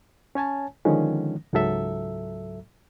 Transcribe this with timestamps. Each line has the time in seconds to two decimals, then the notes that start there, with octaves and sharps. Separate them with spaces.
0.35 C#4 C#5 G#5 A5
0.85 D3 D#3 F3 G#3 C#4
1.53 C#2 G#2 F#3 A4 E5